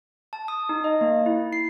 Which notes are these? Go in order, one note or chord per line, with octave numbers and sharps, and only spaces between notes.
A5
D#6
D#4
D#5
A#3
E4
C7